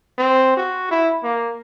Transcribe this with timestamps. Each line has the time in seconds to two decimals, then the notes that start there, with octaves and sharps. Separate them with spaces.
0.18 C4
0.57 F#4
0.91 E4
1.23 A#3